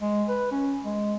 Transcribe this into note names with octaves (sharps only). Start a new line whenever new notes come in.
G#3
B4
C#4
G#3